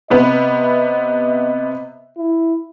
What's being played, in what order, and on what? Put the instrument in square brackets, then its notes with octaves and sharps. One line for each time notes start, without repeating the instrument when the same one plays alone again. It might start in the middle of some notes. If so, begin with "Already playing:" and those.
[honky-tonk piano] C3 B3 B4 [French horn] D#5
[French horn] E4